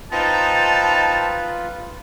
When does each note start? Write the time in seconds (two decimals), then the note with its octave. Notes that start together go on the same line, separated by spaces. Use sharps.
0.12 C4 D#4 F4 B4 A5